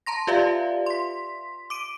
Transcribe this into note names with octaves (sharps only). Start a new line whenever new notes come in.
A5 A#5 C6 A#6
F4 G4 B4 D5 E5 F5
C6 B6
D6 D7 D#7